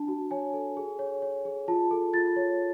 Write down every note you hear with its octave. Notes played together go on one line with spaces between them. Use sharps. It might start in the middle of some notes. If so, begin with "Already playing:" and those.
Already playing: D4 A5
F#4
C#5 G#5
A4
G#4
C#5
C#5
G#4
F4 A5
A4
F4 A6
C#5